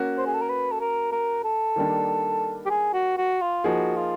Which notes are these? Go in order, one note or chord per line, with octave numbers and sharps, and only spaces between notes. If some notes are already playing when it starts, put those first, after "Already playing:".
Already playing: A#3 C#4 F#4
C5
G#4
A4
A#4
B4
A4
A#4
A#4
A4
D#3 G3 A#3 D4
G4
G#4
F#4
F#4
F4
F3 A#3 D#4 F#4 G#4
F4